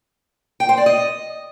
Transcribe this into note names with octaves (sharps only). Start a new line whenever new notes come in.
G5
C5
D5
D#5